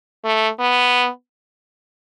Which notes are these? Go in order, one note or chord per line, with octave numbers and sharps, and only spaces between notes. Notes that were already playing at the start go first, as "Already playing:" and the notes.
A3
B3